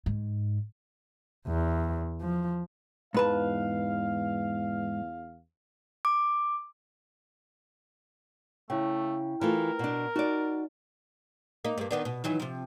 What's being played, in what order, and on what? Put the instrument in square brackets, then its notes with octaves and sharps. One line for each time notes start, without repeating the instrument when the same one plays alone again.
[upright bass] G#2
[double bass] E2
F3
[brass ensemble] E2 F5 [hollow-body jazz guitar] G#2 B4 A5
[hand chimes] D6
[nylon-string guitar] C#3 [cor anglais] A3 [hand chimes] E4 G5
[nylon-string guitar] E3 A3 F4 [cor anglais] A#4
[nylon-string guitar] B2 D4
[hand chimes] D#4 [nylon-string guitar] F#4 D5
[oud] A#3 D#4
G2 A#3
D#3 B3 D4
B2
D#3 E3 F#3
C3 F3